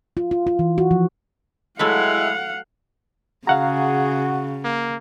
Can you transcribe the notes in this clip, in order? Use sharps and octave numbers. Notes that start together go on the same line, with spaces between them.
F4
F4
F4
E3
F#4
F3
F#3 G#3 A3 E4 B4 F5 F#5
C#3 F#4 G#4 F5 F#5 A#5
A#3